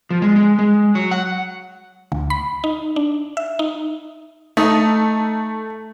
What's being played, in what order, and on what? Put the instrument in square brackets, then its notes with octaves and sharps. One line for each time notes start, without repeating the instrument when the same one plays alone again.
[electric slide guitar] F3
G#3
G#3
G#3
F#3
F#5
[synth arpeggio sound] D2
B5
D#4
D4
E5
D#4
[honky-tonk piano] A3 [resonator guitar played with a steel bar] D#4